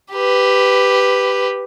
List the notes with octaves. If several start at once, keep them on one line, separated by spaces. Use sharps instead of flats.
G4 B4